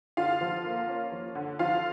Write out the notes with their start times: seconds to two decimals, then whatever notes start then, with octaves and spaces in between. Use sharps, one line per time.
0.17 D3 F4 F5
0.41 F3
0.64 A#3
0.88 C#4
1.12 F3
1.35 D3
1.59 F3 F4 F5